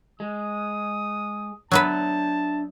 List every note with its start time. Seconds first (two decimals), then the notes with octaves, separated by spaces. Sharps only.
0.20 G#3 D#6
1.72 F#3 B3 D4 B4 E5 A5